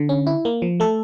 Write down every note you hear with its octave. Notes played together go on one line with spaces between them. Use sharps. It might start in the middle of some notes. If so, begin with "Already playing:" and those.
Already playing: D3
C#4
E4
A#3
F3
A3 A4